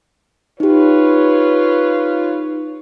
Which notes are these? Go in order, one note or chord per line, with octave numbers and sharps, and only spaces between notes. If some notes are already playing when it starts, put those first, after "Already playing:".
D#4 F4 G4 B4 C#5